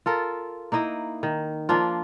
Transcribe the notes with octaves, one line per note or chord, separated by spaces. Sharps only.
F4 A4 A#4
A#3 D#4 E4 D#5
D#3
F3 A#3 D4 F4